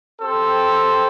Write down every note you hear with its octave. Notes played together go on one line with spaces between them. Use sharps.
C4 G4 A4 C5